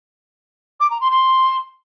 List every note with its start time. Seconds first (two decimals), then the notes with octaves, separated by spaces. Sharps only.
0.80 D6
0.90 A#5
1.01 C6
1.11 C6